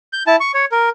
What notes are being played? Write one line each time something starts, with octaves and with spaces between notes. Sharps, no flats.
G6
E4 A5
C#6
C#5
A#4